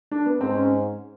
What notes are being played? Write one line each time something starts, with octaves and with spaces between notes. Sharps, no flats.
D4
B3
G#2 C4
C#4